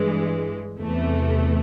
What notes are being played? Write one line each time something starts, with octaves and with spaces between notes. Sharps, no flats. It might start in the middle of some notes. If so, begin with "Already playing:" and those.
Already playing: G2 E3 G#3
E2 C3 E3 A3